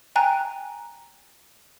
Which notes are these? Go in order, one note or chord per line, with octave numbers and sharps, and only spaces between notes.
G5 G#5 A#5 F#6